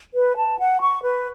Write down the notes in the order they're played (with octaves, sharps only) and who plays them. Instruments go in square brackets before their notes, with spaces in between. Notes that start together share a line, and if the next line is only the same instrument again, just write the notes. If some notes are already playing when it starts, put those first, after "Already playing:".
[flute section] B4
A5
F#5
C#6
B4